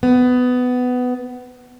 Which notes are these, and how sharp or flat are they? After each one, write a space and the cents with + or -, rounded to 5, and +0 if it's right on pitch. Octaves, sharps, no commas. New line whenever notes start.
B3 +15